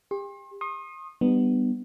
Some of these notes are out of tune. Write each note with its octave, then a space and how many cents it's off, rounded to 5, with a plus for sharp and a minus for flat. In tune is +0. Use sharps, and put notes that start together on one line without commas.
G4 +40 C6 +40
C6 +45 D#6 -10
G3 +0 B3 +10 D4 +40